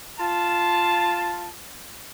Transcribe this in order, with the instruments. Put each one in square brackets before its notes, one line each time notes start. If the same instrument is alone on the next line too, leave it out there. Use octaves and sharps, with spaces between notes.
[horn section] F4 A5